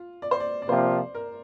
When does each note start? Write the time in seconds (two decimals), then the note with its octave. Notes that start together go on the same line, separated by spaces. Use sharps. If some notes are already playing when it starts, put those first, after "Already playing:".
Already playing: F4
0.22 D5
0.31 C5
0.40 D5
0.62 D5
0.69 C3 F3 A#3 F4 C5
1.15 A#4